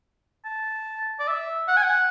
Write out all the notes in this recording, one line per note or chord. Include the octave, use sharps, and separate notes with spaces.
A5
D5
E5
F#5
G#5
F#5